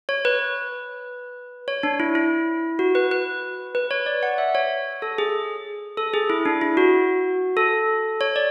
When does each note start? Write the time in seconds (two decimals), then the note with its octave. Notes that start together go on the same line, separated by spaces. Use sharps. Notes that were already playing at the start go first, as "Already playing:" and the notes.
0.09 C#5
0.25 B4
1.68 C#5
1.83 D4
2.00 E4
2.15 E4
2.79 F#4
2.95 B4
3.11 B4
3.75 B4
3.91 C#5
4.06 D5
4.23 F#5
4.38 E5
4.55 C#5
5.02 A4
5.18 G#4
5.97 A4
6.14 G#4
6.30 E4
6.45 D4
6.61 E4
6.77 F#4
7.57 A4
8.21 C#5
8.36 D5